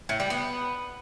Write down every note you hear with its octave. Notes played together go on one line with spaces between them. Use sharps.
A2
G3
B3